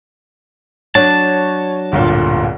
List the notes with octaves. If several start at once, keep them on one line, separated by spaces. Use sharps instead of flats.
F#3 D4 C#5 A5
D1 G1 A#2